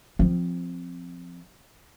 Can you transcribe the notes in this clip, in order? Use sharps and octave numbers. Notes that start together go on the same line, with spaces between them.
F3 C4